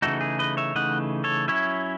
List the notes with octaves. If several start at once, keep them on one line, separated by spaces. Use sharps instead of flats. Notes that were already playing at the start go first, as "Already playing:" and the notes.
C#3 E3 A3 D#4 F#4 A4
G#4
B4 D#5
C#5 E5
C#3 E3 A3 D#4 D#5 F#5
A4 C#5
F#3 C#4 E4 C#5 E5